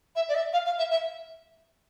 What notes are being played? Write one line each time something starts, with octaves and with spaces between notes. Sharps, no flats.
E5
D5
E5
F5
F5
E5
E5